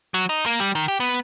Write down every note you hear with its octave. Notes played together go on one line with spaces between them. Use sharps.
F#3
D#4
A#3
G3
D#3
G4
B3